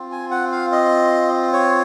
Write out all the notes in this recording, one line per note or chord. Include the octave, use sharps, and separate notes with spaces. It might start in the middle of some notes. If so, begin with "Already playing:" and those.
Already playing: C4 F4
G#5
F#5
F5
D#5
C#5